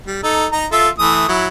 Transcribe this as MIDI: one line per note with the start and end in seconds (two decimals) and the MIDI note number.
0.06 0.21 55
0.23 0.46 63
0.23 0.46 69
0.52 0.66 63
0.52 0.66 82
0.72 0.89 65
0.72 0.89 69
0.72 0.89 76
0.99 1.28 52
0.99 1.28 57
0.99 1.28 87
1.29 1.48 54
1.29 1.48 64